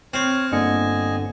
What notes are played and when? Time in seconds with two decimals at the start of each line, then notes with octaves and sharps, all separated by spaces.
0.14 C4 C#5 F6
0.52 G1 D3 A#3 D#5 G#5 C#7